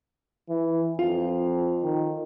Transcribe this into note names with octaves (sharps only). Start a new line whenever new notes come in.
E3
F2 F4
D#3